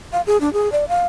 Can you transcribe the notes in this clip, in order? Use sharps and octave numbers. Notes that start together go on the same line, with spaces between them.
F5
G#4
D4
G#4
D5
F5